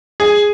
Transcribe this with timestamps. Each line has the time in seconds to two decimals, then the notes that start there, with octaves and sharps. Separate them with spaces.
0.20 G#4